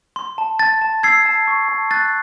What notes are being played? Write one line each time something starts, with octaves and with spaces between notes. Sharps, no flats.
C6
A5
A5 A6
A5
E6 G#6 C7
A5
C#6
A5
F#6 A6